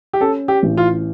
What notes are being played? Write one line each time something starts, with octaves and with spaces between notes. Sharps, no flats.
G4
C#4 A4
G4
A1
F4